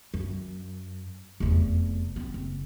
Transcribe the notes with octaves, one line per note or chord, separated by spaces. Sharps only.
F#2
F1 E2
B3 C4
F#1